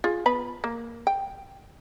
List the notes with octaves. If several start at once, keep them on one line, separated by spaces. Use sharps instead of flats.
F4 G#4
B3 B4 B5
A#3
G5